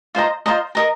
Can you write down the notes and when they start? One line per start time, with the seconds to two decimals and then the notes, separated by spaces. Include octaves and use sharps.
0.15 F4 C5 D#5 A#5
0.46 F4 C5 D#5 A#5
0.75 A#4 D#5 A#5